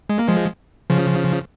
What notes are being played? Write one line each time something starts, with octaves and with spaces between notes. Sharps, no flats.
G#3
A#3
F3 G#3
C#3 F3